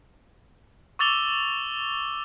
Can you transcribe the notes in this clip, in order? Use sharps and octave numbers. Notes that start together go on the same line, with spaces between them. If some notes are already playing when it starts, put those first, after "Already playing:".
C#6 D6 E6 A6 F7 G7